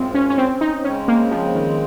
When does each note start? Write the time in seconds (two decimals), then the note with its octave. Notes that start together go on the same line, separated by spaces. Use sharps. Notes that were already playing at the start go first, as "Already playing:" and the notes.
Already playing: F#2 F3 G#3 C4
0.15 C#4
0.30 C#4
0.38 C4
0.61 D#4
0.84 C#3 G#3 C4 C#4
1.08 A#3
1.31 F3
1.55 D#3